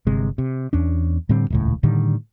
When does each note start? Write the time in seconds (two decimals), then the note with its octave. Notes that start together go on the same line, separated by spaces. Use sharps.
0.07 G1 C3 G#3
0.38 C3
0.73 E2 C#4 D4
1.29 A2 D3 G3 C4
1.50 D#1 C#2 A2
1.83 A2 D3 D#3 G3